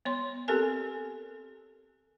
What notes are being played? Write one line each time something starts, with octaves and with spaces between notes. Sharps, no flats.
B3 C#5 C6
C4 G4 A4 A#4 G#5